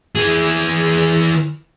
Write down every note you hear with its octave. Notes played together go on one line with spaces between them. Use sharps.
E3 G#4